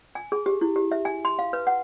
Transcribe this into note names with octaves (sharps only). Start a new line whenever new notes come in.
G#5
G#4
G4
E4
G4
E5
G#5
C6
F5
B4
F#5